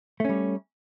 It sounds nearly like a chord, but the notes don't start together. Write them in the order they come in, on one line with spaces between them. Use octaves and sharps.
A3 C#4 G3